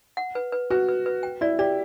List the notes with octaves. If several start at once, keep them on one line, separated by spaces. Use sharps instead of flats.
F#5
B4
B4
F#4 B4
B4
B4
G5
E4 D5
G4 D5